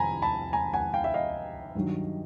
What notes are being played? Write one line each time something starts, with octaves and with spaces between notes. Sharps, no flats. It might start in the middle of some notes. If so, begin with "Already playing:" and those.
Already playing: F2 C3 G#5 A#5 B5
A5 B5
G#5 A#5
F#5 G#5
F5 G5
E5
D#5 F5
G2 D#3 F#3